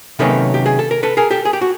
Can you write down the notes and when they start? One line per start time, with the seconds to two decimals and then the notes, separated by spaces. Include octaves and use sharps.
0.19 C3 D#3 F#3 A#3 C#4 A4 B4
0.54 G4
0.66 G#4
0.79 A4
0.91 A#4
1.03 A4 B4
1.17 G#4 A#4
1.31 G4 A4
1.45 G#4
1.53 G4
1.61 F#4